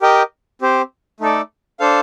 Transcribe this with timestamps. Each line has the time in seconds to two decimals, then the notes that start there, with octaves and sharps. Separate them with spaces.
0.01 G4 A#4 D#5 G5
0.62 C4 G4 C5
1.20 A3 D#4 A4 D5
1.80 D4 A4 C5 F5